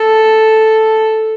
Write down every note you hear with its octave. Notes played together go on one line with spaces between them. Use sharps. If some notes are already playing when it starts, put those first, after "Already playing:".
Already playing: A4